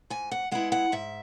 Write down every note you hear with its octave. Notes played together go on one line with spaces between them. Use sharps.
G#2 G#5
F#5
G#3 B3 E4 F#5
F#5
G#2 E5